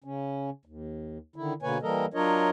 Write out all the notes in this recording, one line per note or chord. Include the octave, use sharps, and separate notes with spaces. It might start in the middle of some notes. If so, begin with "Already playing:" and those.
C#3 C#4
D#2
D3 D#3 E4
B2 D3 A#3 B4 C#5 G#5
E3 G3 A#3 A4 A#4 D#5
F#3 D4 F4 A#4 C#5 D#5